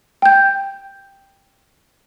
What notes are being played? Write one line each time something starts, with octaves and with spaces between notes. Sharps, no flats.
G5 G6